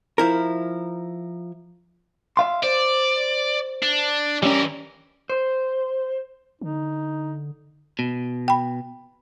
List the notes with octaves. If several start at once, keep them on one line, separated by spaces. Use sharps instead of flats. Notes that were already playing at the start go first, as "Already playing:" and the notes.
F3 E4 A#4
E5 F5 C6
C5 D5
D4
E3 G3 C#4 A#4
C5
D3 D#4
B2
G5 B5